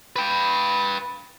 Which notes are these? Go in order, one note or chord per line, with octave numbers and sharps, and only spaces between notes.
B4 G5